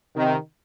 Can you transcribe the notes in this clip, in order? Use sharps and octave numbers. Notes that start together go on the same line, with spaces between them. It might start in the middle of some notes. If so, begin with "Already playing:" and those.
C3 D#3